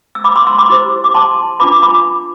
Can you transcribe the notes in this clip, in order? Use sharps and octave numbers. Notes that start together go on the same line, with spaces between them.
E6
B5 D6
C6 E6
C6 E6
B5 D6
E4 G4 C5
D6
A5 C6
D4 F4 B4 B5 D6
B5 D6